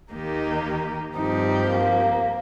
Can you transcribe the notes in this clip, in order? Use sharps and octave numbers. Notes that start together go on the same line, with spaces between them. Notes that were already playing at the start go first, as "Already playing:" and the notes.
D#2 D#3 A#3 D#4 G4
G2 F3 C4 D#4 G4
A#3